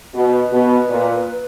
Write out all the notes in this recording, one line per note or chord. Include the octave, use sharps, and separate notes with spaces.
B2 B4
B2
A#2